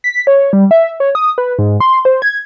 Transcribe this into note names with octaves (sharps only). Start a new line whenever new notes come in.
B6
C#5
G3
E5
C#5
D#6
B4
G#2
C6
C5
G#6